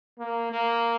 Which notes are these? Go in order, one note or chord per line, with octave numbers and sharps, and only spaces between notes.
A#3
A#3